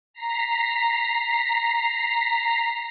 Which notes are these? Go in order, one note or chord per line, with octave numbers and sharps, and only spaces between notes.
A#5 B6 C7